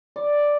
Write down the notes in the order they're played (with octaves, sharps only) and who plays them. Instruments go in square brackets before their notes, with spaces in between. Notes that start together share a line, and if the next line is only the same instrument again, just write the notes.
[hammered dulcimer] D5